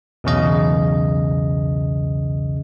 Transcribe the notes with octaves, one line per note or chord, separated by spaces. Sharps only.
B1 E2 C#3 D#5